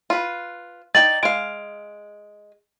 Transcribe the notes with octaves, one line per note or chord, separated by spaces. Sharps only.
F4 B4
D#4 D5 G5 A6 F#7
G#3 F5 D7